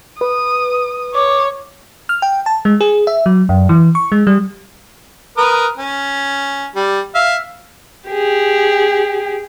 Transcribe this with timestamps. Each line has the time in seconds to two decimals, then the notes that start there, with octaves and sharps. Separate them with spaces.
0.21 B4 D#6
1.14 C#5 D6
2.09 F6
2.22 G5
2.46 A5
2.65 G#3
2.81 G#4
3.07 E5
3.26 F#3
3.49 F#2
3.69 E3
3.95 C#6
4.12 G#3
4.27 G3
5.37 A#4 B4 D#6
5.78 C#4
6.75 G3
7.15 E5 F5
8.09 G4 G#4